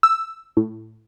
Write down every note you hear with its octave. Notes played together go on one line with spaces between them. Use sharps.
E6
A2